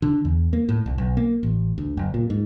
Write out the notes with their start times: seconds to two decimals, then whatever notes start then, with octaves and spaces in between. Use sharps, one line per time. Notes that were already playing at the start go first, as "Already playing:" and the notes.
0.02 D3
0.25 E2
0.53 A#3
0.69 A2
0.86 C2
0.98 B1
1.17 A#3
1.43 A1
1.78 D2
1.97 F#1
2.14 A#2
2.30 G#2